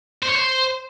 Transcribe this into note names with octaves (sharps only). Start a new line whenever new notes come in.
C5
C#5
C5